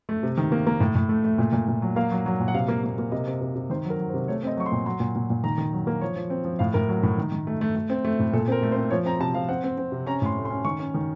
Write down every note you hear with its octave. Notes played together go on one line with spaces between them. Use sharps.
A3
C3
D#3
A#3
A#3
A2
A2
A3
A3
A#2
A#2
A#2
F#3
A#3 F5
F#3
F#3
A#2
F#5
C3 F5
A#3
A#3
A#3
C3 D#5
C3
C3
C3
D#3 C5
F#3
A#4
F#3
C5
C3
A3 C#5
C4 D#5
F#3 C#6
C6
A#2
F#3 C6
A#2
A#2
A#2
D#3 A#5
D#3
F#3
A#3
F3 C#5
F3
C4
F3
A2 F5
A2 A#4
F#3
A2
D#3
D#3
A3
A3
A3
C4
A3
A2
A#2 A4
C4 A#4
A3
C5
C4
F3 C#5
C4 A#5
C3 A5
F3 F5
C4 F#5
C4
C4
C3
C#4 A#5
A2 C6
A3
C6
C#4
D#3 C#6
C#4
D#3